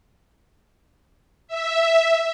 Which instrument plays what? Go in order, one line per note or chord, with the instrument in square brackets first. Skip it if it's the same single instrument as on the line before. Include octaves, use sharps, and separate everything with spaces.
[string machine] E5